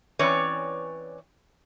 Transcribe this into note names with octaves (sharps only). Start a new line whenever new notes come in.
E3 C4 C#4 B4 C#5 D5